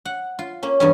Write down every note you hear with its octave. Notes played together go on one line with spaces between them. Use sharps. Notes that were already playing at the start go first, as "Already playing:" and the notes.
F#5
F4
A#3 C#4
E2 G2 C#4